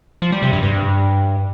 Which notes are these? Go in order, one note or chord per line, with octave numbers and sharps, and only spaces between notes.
F3
G3
C3
G2
G2